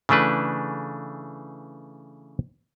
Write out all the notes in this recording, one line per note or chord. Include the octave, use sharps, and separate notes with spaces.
C#3 E3 A3 D4 B4